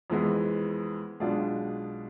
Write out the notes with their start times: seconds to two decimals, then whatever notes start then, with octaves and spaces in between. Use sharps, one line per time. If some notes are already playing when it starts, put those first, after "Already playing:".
0.10 F2 E3 G#3 B3
1.20 B1 B2 G#3 D4 F4